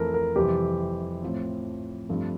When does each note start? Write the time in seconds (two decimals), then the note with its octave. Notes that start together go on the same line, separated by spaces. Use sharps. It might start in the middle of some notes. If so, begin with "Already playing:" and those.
Already playing: F2 E3 A3 C4 A4 A#4
0.14 A#4
0.36 F2 C3 E3 G3 C4 G4
1.23 A2 F3 C4
2.09 G2 F3 A3 C4